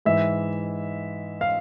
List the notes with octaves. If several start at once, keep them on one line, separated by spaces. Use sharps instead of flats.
G#2 E3 E5
F5